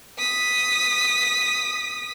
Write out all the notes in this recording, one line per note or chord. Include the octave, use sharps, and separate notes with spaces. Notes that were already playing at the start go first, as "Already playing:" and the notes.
D#6 B6